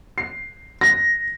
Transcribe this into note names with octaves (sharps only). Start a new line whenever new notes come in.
C7
A#6